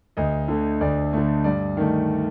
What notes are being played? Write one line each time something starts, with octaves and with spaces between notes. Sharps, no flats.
D2 D#5
D3 A3
D2 D5
D3 A3
G2 D5
D#3 A3